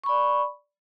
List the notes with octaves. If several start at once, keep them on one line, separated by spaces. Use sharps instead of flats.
D5 B5 C#6